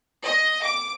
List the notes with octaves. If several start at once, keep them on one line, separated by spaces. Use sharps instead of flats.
D#5
D6